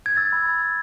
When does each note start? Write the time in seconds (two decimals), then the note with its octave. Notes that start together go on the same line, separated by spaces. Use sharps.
0.06 G#6
0.17 E6 A6
0.33 B5
0.46 B5
0.62 E6